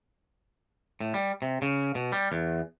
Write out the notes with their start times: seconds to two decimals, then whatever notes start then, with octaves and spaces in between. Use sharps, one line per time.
1.01 A2
1.14 G3
1.42 C3
1.62 C#3
1.95 B2
2.12 G3
2.32 E2